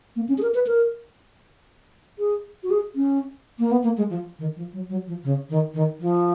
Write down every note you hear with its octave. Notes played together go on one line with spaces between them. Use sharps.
A#3
C#4
G#4
A#4
B4
A#4
G#4
F#4
G#4
C#4
A#3
B3
A#3
G#3
F3
D#3
F3
F#3
F#3
F3
C#3
D#3
D#3
F3